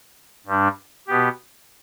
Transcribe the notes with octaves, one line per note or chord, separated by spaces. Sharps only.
G2 G3 D4
B2 B3 G4